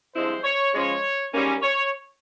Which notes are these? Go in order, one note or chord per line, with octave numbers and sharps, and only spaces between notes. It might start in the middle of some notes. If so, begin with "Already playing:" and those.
G2 F3 G#3 C4 E4 C5
C#5
C#3 F3 G#3 C#4 C#5
G#2 G3 A#3 C#4
C#5